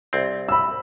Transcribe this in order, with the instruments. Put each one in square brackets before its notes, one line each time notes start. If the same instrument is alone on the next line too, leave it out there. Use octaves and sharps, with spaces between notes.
[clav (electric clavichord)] C2 C4
[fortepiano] B5 E6